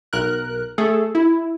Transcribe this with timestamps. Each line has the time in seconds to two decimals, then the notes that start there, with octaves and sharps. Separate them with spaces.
0.13 B1 A#4 F#6
0.78 A3 G#4 A4
1.15 E4